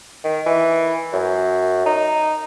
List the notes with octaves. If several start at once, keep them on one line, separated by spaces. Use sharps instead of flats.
D#3
E3
F#2
D#4